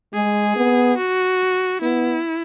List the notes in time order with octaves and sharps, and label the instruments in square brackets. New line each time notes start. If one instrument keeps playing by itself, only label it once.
[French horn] G#3 [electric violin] G#4
[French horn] B3
[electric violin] F#4
[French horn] B3 [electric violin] E4